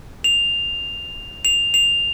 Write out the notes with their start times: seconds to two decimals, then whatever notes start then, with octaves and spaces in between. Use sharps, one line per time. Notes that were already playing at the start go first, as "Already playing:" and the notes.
0.24 F7
1.45 F7
1.74 F7